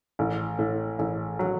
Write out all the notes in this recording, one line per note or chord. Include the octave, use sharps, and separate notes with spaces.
A1
A2
A1
F#3